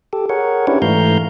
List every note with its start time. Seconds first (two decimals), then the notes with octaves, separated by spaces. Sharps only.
0.13 G4 A4
0.29 G#4 A#4 C#5 F#5
0.67 C#4 D4 E4 G4 B4 C#5
0.82 G#2 E3 A3 F5 A#5 G6